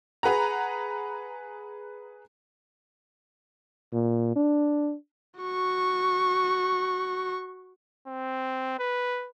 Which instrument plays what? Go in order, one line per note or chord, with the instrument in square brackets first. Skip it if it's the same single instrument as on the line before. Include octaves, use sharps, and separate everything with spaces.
[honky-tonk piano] G#4 B4 F#5 A#5
[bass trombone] A#2
D4
[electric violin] F#4 C#6
[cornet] C4
B4